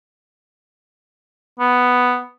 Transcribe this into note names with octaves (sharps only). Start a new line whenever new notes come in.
B3